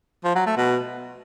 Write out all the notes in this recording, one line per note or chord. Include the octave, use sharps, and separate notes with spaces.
F3
F#3
A3
B2